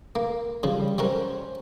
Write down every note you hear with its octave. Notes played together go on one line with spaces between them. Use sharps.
A#3 A#4
C#3 F3 G3
G3 C#4 F#4 A#4 C5